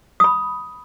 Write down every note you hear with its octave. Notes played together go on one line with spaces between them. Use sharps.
B5 D#6